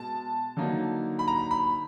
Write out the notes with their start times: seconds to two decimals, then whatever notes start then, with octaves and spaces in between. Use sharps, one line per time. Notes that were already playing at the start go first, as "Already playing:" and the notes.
Already playing: B2 G#3 A5
0.57 D3 F#3 A#3 D#4
1.19 B5
1.28 A#5
1.51 B5